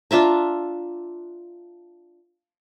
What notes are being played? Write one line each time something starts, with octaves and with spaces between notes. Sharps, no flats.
D4 F4 E5 A#5